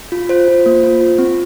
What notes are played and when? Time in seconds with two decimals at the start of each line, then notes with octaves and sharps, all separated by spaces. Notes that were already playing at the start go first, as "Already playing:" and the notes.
0.12 F4
0.29 F4 C5
0.48 F4
0.66 A#3
0.83 F4
1.01 F4
1.18 C4